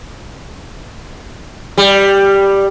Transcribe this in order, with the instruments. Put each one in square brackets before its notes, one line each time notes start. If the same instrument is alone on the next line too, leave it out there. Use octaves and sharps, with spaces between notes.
[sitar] G3